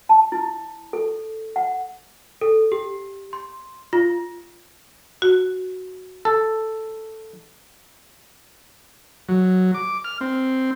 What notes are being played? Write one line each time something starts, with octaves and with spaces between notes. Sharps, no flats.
A5
E4
A4
F#5
A4
G4
C6
F4
F#4
A4
F#3
D6
F6
C4